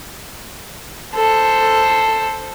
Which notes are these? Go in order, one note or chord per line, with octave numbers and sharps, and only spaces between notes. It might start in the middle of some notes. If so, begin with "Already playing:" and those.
A4 C5